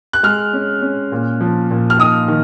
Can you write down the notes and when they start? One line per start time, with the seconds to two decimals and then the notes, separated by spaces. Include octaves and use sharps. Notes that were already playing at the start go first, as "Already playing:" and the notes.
0.13 F#6
0.23 G#3 F6
0.53 C#4
0.82 C#4
1.12 A#2
1.41 F3
1.71 A#2
1.90 F6
1.99 D#4 D#6
2.28 D#3